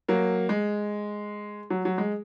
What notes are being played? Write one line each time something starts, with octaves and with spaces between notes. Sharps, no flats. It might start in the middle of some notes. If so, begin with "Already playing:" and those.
F#3 A#3
G#3
F#3
F#3
G#3